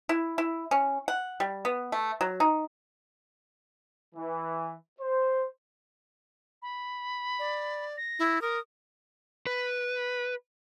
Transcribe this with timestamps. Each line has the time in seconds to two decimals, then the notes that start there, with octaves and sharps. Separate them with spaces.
0.09 E4
0.38 E4
0.71 C#4
1.08 F#5
1.40 G3
1.65 B3
1.92 A3
2.21 F#3
2.40 D#4
4.15 E3
5.01 C5
6.62 B5
7.39 D5
7.97 A#6
8.19 E4
8.42 A#4 D#6
9.47 B4